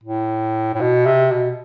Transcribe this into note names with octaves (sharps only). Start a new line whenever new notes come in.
A2
A2
B2
C3
B2